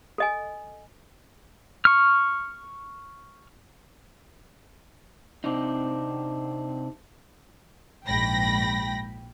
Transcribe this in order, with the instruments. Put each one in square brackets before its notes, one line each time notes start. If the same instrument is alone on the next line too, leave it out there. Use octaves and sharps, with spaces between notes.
[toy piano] A4 D#5 G#5
[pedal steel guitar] C#6 F6
[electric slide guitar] C3 C4 D4 D#4
[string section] A#1 G#2 G5 B5 A#6